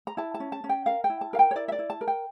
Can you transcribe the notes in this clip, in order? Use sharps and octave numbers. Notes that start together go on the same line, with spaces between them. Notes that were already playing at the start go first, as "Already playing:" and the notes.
A#5
E4 A5
A5
C#4
A5
C#4
G5
A#4 F5
G5
E4
A5
A#4 F5
G5
C#5
E4 D5
E5
D5
E4
A5
A#4
G5